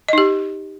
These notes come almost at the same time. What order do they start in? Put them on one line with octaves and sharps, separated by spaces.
D#5 D#4 G4